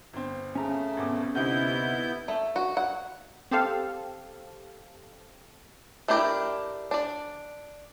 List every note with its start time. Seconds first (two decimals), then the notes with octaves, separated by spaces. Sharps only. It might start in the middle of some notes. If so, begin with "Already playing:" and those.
0.13 G1 C4
0.55 C#3 A3 C#4 A#5
0.97 G#1 B2 D6
1.35 D2 C3 B3 D#4 E4 G6
2.28 A3
2.56 F#4
2.77 F#5
3.51 C4 G4 A4 F5
6.08 A3 D4 E4 G4 A#4
6.91 D4 D5